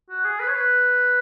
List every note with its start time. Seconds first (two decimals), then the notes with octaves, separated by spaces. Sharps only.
0.10 F#4
0.25 G#4
0.40 B4
0.48 C#5
0.55 B4